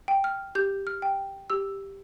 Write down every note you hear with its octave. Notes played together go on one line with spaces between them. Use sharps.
G5
F6
G4 G6
F6
G5
G4 E6